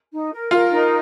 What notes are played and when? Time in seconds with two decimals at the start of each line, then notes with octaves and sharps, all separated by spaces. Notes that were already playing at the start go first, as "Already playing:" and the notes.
0.11 D#4
0.32 A#4
0.51 F4 A#4 F5
0.71 D#4